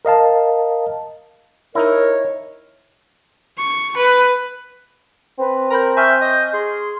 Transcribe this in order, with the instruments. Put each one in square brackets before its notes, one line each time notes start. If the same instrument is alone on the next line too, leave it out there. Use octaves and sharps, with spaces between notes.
[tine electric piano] A#4 D#5 F5 A5
[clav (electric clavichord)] D#4 E4 [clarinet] A#4 [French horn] C#5
[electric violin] C#6
B4
[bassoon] C4 [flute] B4
[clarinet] A#4 [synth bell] A#5 B5 G6
[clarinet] E5 [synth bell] G#5 C#6 F6 [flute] G6
[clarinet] D#5
[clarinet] G#4 [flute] C6